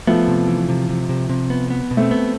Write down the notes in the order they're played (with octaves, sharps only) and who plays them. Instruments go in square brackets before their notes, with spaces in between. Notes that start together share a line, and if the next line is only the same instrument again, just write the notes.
[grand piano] F3 A3 [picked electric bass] B3
[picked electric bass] C3
E3
C3
C3
C3
C3
B3
B3
B2
[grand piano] A3 C4
[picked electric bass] B3